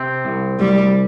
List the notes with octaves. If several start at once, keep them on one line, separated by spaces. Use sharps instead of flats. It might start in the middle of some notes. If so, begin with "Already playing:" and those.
Already playing: C3 C4
C2
C2 G3